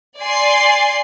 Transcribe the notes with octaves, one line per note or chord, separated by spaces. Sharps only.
D5 G#5 C6 C7